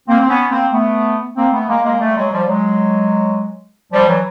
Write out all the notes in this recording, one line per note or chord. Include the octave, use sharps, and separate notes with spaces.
A#3 C4
C4
B3 C#4
A#3 C4
A3 B3
A#3 C4
A3 B3
G#3 A#3
G#3 A#3
G3 A3
F#3 G#3
F3 G3
F#3 G#3
F3 G3
E3 F#3